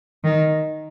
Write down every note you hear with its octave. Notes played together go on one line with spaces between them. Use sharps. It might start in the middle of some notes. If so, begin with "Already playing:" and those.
D#3